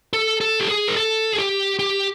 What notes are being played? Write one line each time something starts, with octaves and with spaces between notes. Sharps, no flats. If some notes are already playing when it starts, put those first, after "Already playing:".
A4
A4
G4
G#4
A#4
A4
G#4
G4
G4